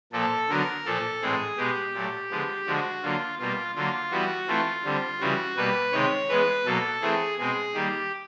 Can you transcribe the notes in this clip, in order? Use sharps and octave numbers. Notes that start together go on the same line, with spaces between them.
A#2 F3 A#3 A4
D3 F#3 B3 A#4
A#2 F3 A#3 A4
A2 E3 G#3 C4 G#4
B2 G#3 B3 G4
A#2 F#3 A3
D3 F3 G#3 B3
D3 F3 G#3 F#4
D3 F#3 A#3 F4
B2 G3 A#3 F4
D3 F#3 A#3 F4
E3 G3 B3 F#4
E3 A3 C4 F4
D3 G3 C4
C#3 E3 G3 F#4
B2 G3 A#3 B4
C3 D#3 G#3 C4 C#5
E3 G#3 B3 B4
B2 F#3 A#3 A4
E3 A3 C4 G#4
B2 G#3 C4 G#4
D#3 G3 A#3 G4